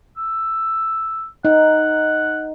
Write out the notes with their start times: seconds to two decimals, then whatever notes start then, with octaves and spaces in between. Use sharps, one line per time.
0.17 E6
1.45 D#4 F#5